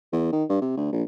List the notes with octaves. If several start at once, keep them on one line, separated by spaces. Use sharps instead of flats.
E2
D#3
G2
C3
D2
A#1